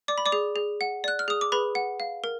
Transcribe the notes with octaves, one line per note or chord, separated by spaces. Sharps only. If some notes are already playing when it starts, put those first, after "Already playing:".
D5 D6
B5
D5 D6
G#4
G#4
F#5
D5 F#6
F6
G#4 D#6
D6
G#4 B4 B5
F#5
F5
A#4